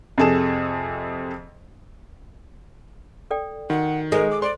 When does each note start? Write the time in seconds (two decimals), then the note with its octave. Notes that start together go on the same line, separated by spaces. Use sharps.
0.18 F2 C3 G#4 A4 E7
3.31 A4 D5 G5
3.70 D#3 F#4 F#5
4.12 G#3 A4 A#4 C5
4.31 D6
4.42 C5 D5 C6